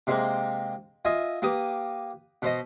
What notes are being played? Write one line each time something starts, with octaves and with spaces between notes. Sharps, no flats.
C3 G#3 A#3 C4
F4 D#5 E5 G#5
A#3 G4 B4 D#6
B2 C5 D#5